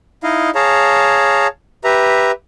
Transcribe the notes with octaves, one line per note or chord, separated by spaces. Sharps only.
D#4 E4 D#5 F5
G#4 C#5 F5 A5 A#5
G4 B4 E5 A#5